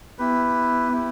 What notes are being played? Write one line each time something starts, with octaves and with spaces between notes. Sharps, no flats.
B3 E4 G4 B4
E4 G4